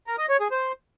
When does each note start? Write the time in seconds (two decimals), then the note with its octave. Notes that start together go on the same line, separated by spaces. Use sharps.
0.07 A#4
0.18 D#5
0.29 C#5
0.40 G#4
0.51 C5